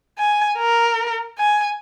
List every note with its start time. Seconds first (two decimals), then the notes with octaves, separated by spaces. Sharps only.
0.18 G#5
0.58 A#4
1.38 G#5